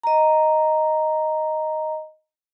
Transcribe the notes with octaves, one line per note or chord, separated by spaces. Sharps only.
D#5 A#5